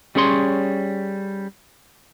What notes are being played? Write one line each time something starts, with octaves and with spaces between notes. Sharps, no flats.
G3 C#4 G#4 C#5 C6